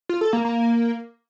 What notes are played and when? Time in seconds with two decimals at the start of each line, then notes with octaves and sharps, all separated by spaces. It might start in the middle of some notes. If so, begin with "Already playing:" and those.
0.09 F4
0.21 A4
0.33 A#3
0.45 A#3